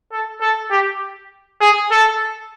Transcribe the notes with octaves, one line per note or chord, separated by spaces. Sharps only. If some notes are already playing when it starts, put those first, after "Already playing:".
A4
A4
G4
G#4
A4